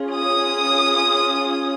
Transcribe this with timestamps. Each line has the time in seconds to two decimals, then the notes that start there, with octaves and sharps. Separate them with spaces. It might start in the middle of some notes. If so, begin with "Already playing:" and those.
Already playing: C#4 F4 G#4
0.15 D#6